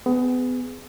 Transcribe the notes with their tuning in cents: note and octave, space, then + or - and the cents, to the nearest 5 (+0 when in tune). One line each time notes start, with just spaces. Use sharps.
B3 +30 G#4 +0